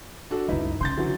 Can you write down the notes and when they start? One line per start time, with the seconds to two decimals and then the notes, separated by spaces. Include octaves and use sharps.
0.30 D4 F#4 A4
0.48 C#2 F#2 D#4 E4 B4
0.81 C#3 C6 G6 A6
0.97 D3 E3 F#3